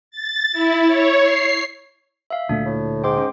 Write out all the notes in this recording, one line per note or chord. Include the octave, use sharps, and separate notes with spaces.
A6
E4
C#5
C7
E5 F5
D2 A#2 A3 D4
A2
G#2 G5 C6 D6
C#4